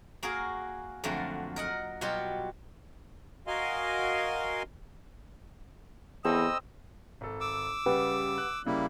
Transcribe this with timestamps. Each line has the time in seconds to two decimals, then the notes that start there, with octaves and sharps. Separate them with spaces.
0.23 A#3 F#4 G#4 A#4
1.04 F2 D3 F#3 A3 A#3
1.56 A#4 D#5 F#5
2.01 B2 F#3 G3 F4 G4
3.47 F#4 A#4 D#5 F5 G#5 C6
6.25 E2 C4 A4 D#5 B5 E6
7.21 G#1 A4
7.40 D6 E6
7.86 C#3 G3 G4 B4 F#5
8.38 F#6
8.66 C#3 G3 A#3 E4